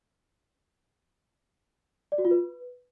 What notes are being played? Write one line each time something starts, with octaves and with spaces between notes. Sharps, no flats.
D5
F#4
F4
B4